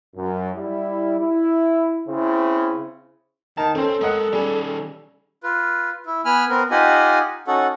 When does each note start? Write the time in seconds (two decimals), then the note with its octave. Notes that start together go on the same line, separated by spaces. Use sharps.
0.16 F#2
0.55 G3 E4
1.19 E4
2.08 C#3 C4 E4
3.58 D#3 A5 A#5
3.75 C4 C#4 A4 C5
4.01 G#3 A#4 D#5 F#5
4.33 D#3 G3 C#4 G#4
5.43 F4 B4
6.06 E4
6.25 B3 G#5 B5 F6
6.49 B3 C4 A#4
6.71 D#4 F4 G4 D#5 F#5 G#5
7.47 C#4 D#4 F#4 A4 F#5